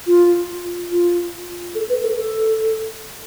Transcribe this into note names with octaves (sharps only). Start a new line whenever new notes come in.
F4
F4
A4
B4
A4
A4